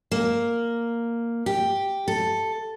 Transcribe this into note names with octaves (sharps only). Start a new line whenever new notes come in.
A#3
G4
A4